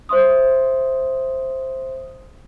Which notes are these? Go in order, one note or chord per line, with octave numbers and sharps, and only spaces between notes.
C5 E5 C6 D#6